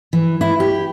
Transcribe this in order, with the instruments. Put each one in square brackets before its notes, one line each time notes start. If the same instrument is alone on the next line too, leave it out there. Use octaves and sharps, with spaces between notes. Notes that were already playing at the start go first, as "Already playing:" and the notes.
[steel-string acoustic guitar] E3
E4
G4